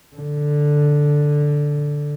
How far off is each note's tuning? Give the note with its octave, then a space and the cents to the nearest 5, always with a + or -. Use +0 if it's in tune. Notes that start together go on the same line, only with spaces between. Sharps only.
D3 +0